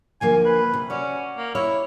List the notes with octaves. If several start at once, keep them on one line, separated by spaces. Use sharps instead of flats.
D2 F3 A#3 G#5
B4
C3
C#4 F#4 D5
A#3
E4 C#5